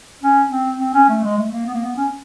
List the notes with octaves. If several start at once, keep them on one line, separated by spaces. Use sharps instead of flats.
C#4
C4
C4
C#4
A3
G#3
A3
A#3
B3
A#3
B3
C#4